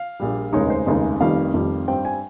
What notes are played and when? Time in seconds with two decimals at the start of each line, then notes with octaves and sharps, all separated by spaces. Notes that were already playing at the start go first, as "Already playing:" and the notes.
Already playing: F5
0.20 A#1 A#2 G3
0.53 F1 D#2 C#3 G#3 D#4 C#5
0.70 C5
0.86 F1 D#2 C#3 G#3 D#4 D#5
1.21 F1 F2 D#3 G3 F5
1.54 F1 F2 D#3 G3
1.88 G2 G3 C4 G5
2.05 G#5